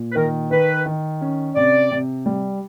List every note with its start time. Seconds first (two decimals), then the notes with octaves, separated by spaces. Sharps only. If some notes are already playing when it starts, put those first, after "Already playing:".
Already playing: A#2
0.12 B4
0.16 D#3 A#4
0.51 D#3 B4
0.86 D#3
1.21 C#4
1.55 C3 D5
1.91 C3
2.26 G3